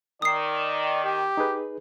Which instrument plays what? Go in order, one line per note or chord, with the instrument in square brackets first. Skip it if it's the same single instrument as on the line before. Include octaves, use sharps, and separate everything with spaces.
[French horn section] D#3 [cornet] D5 [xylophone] D#6 C7
[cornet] G4
[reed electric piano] D#4 G#4 B4